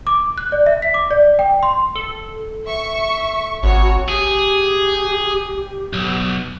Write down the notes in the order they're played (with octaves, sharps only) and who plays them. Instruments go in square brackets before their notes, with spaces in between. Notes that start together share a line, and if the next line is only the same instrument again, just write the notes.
[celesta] D6
F#6
D5
E5
B6
D6
D5
G5
C6
[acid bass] A4
[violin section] E5 C#6
[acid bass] G#1 [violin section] F#4 C#5
[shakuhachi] G4 [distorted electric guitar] G#4
[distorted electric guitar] B1